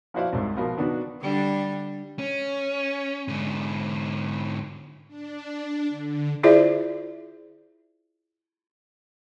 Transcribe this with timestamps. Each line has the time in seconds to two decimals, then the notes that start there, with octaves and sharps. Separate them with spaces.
0.14 F3 E4 F#4 C5 D5 F5
0.33 C2 G#2
0.57 B2 F3 A#4 B5
0.77 B2 D#3 B3 D4 F#4
1.21 D3 G3 D4
2.19 C#4
3.28 G#2 D3
5.07 D4
5.88 D3
6.43 E4 F4 G#4 C5 D5 E5